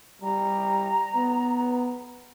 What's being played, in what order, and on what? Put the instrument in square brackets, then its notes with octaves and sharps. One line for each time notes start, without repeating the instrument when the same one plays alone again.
[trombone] G3 [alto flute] A#5
[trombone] B3